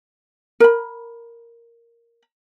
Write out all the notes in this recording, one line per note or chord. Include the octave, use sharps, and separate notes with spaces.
A#4 B5